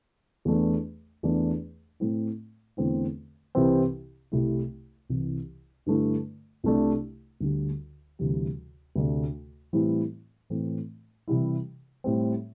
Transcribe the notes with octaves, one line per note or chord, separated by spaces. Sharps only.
E2 E3 A3 D4
E2 E3 A3 D4
A2 A3 C4 E4
E2 D3 A3 C4 E4
C2 C3 E3 C4
C2 C3 A3 E4
C2 C3 E3
G2 D3 A3 E4
C2 C3 A3 D4
D2 D3 G3
D2 C3 E3 G3
D2 C3 A3 D4
A2 E3 G3 C4 E4
A2 E3 A3 C4
C3 E3 G3 E4
A2 G3 C4